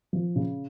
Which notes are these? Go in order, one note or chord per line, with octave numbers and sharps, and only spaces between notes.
F3
C#3